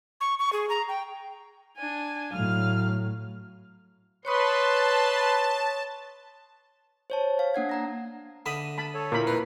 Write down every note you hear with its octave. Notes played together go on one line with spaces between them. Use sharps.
C#6
C#6
G#4
A#5
G5
D4 G#5
A2 F#3 F5 F6
B4 C#5 A5 C6 C#6 D#6
C5 C#5 A5
F5
A#3 D4 F#5 G#6
F#5 A#5 A#6
D3 D#5 E5 B5
A5 B5
A4 C#5
A#2 E4 A#4 B5
F2 F4 B4 A#5 B5